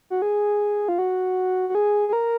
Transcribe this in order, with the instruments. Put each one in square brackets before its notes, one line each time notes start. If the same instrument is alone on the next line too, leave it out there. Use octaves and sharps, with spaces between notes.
[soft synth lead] F#4
G#4
F4
F#4
F#4
G#4
G#4
A#4